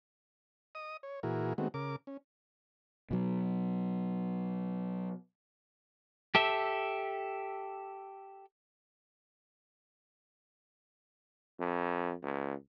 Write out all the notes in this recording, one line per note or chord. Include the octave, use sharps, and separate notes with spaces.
D#5 D#6
C#5
A#2 E3 E4 F#4 G#4 A#4
D#3 G#3 A3 B3 C4 F#4
C#3 A#4 D6
C#4
B2 F#3
G4 A4 E5
F2
C#2